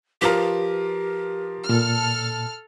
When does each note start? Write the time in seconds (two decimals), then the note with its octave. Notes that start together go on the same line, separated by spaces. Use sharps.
0.22 F3 F4 G4 A#4 B4
1.69 A#2 A4 F6